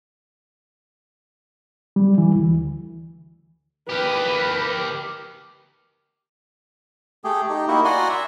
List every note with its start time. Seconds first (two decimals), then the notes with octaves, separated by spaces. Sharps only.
1.96 G3
2.18 E3
2.35 D2
3.89 G4 A#4 B4
7.24 A3 G4 G#4
7.49 D#4 G4
7.68 A#3 D#4 E4 F#4
7.85 F#4 D5 F#5 G#5 A#5 C6
8.09 E5